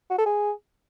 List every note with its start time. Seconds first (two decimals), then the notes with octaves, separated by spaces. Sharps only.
0.10 F#4
0.18 A4
0.26 G#4